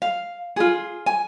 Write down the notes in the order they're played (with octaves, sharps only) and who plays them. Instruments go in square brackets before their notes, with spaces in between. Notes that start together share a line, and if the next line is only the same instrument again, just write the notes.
[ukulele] F5
F4 G#4
G#5